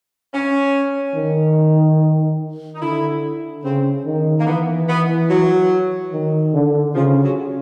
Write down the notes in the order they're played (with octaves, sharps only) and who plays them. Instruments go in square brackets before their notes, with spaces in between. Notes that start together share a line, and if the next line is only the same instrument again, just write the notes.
[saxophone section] C#4
[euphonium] D#3
[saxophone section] D#4
[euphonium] D3 [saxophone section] E4
[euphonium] C#3 [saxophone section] C4
[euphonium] D#3
[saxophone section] A#3
[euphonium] E3 [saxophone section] B3
[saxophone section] B3
F#3
[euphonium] D#3
D3
[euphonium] C#3 [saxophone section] F3
[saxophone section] F#3